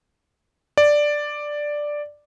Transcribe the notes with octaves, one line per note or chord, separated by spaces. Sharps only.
D5